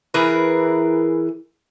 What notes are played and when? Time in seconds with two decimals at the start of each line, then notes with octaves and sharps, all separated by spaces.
0.14 E3 G#4 A#4 B4